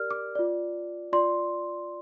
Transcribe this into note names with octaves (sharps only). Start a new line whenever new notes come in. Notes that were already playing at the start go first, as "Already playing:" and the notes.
Already playing: G4 A#4 D5 F6
D6
F4 D5
F4 D5 C6